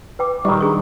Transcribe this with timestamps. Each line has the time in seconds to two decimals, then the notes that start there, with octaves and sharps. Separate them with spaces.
0.19 B4 G5 D6
0.45 A#2 D#3 F#3 G3 D#4 C#6
0.61 D4 G#4